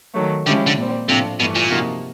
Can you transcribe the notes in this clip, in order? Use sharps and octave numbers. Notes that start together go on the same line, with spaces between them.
D#3 F#3 A3
D3 F3 G#3 C#4 E4 G4
D3
A#2 G3 C4
A2 C3 F3 A3 D4 F4
G2 B2 E3 A3
A#2
C3 F3 A#3 D#4 F#4